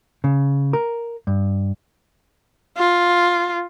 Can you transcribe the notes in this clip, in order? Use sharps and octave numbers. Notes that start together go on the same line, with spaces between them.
C#3
A#4
G2
F4